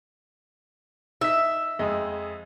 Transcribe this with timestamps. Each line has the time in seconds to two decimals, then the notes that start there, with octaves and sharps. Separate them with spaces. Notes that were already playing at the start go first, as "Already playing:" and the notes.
1.21 D#4 E5 B6
1.79 F2 G#3 D#5